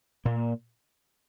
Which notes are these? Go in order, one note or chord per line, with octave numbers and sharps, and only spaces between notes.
A#2 A#3